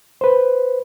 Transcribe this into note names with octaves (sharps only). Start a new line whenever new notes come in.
B4 C5